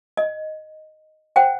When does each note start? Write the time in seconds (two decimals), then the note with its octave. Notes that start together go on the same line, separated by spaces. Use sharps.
0.17 D#5
1.36 C5 F#5 G5